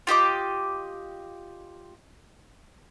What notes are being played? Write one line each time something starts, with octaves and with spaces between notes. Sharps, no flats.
F4 G4 D#5 D6